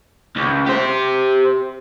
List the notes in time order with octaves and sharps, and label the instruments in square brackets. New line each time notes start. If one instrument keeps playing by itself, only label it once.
[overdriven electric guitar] C#2
G4 C5